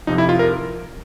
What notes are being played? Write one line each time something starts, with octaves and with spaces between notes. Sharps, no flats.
F2 C3 F3 D#4
E4
F4
A#4